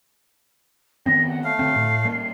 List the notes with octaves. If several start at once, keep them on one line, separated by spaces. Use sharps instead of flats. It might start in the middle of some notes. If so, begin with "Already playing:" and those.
D#3 B3 C4 A#6
F#5
A3 F5 C7
D3 C4
A2
G3 A#3